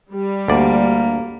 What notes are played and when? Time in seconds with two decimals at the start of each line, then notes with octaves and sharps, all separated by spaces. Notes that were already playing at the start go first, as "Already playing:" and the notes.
0.11 G3
0.48 D2 A#3 D5